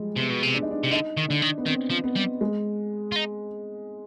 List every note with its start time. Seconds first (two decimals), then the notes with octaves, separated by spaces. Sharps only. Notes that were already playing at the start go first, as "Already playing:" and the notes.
Already playing: F3 G3 G#3
0.17 C3 B3
0.30 B2
0.43 C3
0.54 D4
0.63 D#4
0.71 D4
0.83 C3
0.91 D3 D#4
1.17 D#3
1.28 D3 D4
1.42 D#3
1.58 B3
1.66 D#3 C4
1.91 F3
2.04 B3
2.16 G3
2.41 G#3
3.12 F4
3.16 D#4